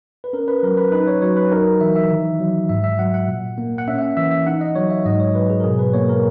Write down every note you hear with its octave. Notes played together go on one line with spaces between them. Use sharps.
B4
C#4 A#4
B4
F#3 A#4
B4
D#4 B4
C#5
F#3 C#5
B4
D#4 A#4
E3 E5
E5
D#3
F#3
G#2 E5
E5
F#3 F#5
F#5
A#2
A#3
F#5
C#4 E5
E5
F#5
E3 E5
E5
D#4 F#5
D#5
F#3 C#5
E5
G#2 D#5
C#5
F#3 B4
G#4
A#4
B2 G#4
B4
A#3 C#5
A#4